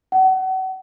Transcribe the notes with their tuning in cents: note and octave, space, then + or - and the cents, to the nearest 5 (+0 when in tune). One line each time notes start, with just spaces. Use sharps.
F#5 +35